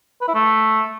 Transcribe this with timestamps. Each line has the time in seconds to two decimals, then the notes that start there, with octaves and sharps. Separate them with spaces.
0.21 B4
0.28 E4
0.35 A3